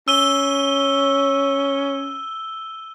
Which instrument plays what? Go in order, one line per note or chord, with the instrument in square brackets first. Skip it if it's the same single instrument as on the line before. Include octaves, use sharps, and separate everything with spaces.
[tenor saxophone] C#4 [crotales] E6 D#7 G7